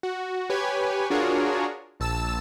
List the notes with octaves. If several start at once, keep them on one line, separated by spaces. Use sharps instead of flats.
F#4
G4 B4 C#5 G#5
D4 F4 F#4 G#4 A#4 C#5
A#1 A5 E6 E7